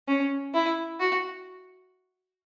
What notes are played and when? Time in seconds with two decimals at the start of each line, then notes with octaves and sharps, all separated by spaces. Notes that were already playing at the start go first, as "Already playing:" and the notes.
0.08 C#4
0.54 E4
1.00 F#4